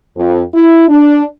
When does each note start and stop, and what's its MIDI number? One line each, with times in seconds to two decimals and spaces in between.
0.16 0.42 41
0.54 0.86 64
0.89 1.25 62